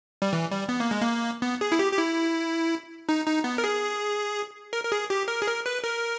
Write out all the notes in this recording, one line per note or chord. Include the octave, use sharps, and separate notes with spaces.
G3
E3
G3
B3
A#3
G#3
A#3
B3
G#4
E4
G4
G4
E4
D#4
D#4
B3
A#4
G#4
A#4
A#4
G#4
G4
A#4
G#4
A#4
B4
A#4